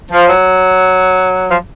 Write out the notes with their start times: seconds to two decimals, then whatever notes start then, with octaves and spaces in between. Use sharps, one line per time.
0.12 F3
0.28 F#3
1.51 F3